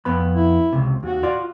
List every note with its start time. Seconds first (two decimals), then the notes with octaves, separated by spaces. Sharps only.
0.05 F2 B3 B5
0.35 E4
0.73 C#2 C3
1.03 D#2 F#4
1.23 F4 D5